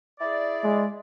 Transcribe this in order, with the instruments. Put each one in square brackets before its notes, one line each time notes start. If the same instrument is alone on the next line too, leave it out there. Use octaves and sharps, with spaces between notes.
[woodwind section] E4 G#4 D5
[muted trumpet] G#3